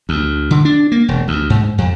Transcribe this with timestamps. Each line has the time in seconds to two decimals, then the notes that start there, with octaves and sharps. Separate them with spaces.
0.09 D2
0.51 D3
0.65 D4
0.92 A#3
1.08 E1
1.28 D2
1.50 G#2
1.78 F2